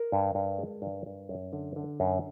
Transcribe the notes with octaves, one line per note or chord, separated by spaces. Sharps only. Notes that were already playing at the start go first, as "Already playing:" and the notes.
Already playing: A#4
G2
G2
G#3
G2
G2
F#2
D3
D3
F#2